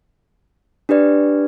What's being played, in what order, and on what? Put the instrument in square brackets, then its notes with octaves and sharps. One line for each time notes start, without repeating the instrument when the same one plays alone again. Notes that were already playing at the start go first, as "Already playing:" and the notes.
[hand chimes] D4 G4 B4 D5